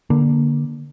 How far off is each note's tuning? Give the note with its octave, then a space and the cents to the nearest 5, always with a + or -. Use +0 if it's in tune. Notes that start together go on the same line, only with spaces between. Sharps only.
D3 +0 A#3 +20